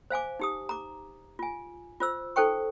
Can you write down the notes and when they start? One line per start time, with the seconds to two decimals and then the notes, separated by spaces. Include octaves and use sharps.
0.10 C5 F5 G#5 D6
0.40 D#4 G4 D#6
0.69 A#5 D6
1.39 F4 G#5
2.00 F4 C5 E6
2.36 D#4 A4 C5 G5 C#6